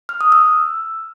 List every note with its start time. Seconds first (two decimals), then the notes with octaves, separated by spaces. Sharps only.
0.09 F6
0.21 D#6
0.32 E6